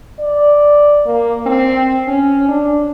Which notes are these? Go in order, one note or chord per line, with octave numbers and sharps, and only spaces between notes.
D5
A#3
C4
C#4
D4